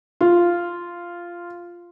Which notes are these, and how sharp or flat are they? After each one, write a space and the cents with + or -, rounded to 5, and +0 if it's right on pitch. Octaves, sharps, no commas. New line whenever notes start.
F4 -5